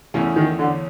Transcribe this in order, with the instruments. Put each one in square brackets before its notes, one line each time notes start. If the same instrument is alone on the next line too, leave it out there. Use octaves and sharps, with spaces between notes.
[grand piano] E2 C#3 E3 A3 C#4
[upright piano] D#3
D3